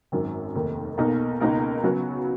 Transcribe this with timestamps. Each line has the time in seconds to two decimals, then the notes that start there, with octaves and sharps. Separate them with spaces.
0.12 G#1 F#2 D#3 F#3
0.55 F1 D#2 D#3
0.98 B1 B2 A#3 D#4 A#4
1.40 C#2 B2 A#3 D#4 A#4
1.84 C#3 F#3 B3 F#4